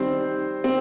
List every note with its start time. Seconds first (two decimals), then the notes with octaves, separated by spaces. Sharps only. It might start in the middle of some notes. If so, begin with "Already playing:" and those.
Already playing: D#3 G3 C4 C5
0.64 C4